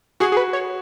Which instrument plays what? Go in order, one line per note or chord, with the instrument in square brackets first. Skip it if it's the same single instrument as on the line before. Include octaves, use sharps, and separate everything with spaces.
[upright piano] F#4 [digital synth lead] G#4
[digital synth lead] G#4
B4
C#5